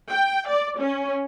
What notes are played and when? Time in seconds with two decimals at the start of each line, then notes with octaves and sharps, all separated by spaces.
0.10 G5
0.47 D5
0.79 C#4